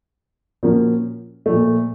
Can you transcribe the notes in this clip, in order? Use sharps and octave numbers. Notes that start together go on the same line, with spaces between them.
A#2 F3 A#3 C#4 F#4
A#2 F3 A3